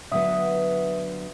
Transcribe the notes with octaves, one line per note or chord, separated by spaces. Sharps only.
D3 F#3 B3 E5 D#6